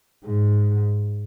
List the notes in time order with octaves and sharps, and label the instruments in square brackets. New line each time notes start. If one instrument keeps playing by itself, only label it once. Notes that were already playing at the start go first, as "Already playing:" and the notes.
[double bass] G#2